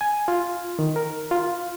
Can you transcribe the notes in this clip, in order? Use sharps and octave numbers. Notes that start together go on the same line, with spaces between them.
G#5
F4
D#3
A#4
F4